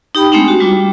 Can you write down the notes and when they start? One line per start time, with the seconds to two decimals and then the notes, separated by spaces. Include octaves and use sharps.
0.15 D#4 G4 G5 B5
0.32 G#3 A3 C4 D4 D#4
0.48 F#4
0.60 G3 F4 D6